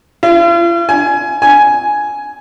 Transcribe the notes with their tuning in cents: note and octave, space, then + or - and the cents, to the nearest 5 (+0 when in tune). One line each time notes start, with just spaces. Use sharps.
F4 -45
G#5 +20
G#5 +5